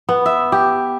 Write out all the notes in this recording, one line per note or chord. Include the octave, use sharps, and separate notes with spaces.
B3
E5
G4